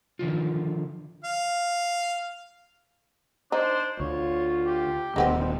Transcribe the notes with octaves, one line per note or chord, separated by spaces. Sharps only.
D3 D#3 F3 F4
F5
D4 D#4 C5
D2 F4 C#5
G4
D#1 D#2 D3 G#3 B3 C4